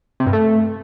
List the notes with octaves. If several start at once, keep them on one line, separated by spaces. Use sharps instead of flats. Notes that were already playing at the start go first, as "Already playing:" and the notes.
C3
G2
A3